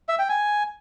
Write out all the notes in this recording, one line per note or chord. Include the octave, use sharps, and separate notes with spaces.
E5
G5
G#5